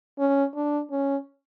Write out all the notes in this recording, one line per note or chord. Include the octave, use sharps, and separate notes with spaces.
C#4
D4
C#4